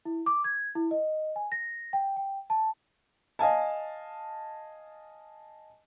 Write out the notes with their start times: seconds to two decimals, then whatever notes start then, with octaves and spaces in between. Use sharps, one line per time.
0.05 E4
0.26 D6
0.44 G#6
0.75 E4
0.91 D#5
1.36 G#5
1.52 A#6
1.93 G5
2.17 G5
2.50 A5
3.39 D#5 F5 G#5 A5